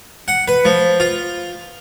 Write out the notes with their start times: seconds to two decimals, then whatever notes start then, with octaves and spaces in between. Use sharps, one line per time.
0.28 F#5
0.48 B4
0.65 F3
1.00 F4